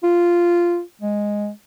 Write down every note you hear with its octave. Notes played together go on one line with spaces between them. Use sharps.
F4
G#3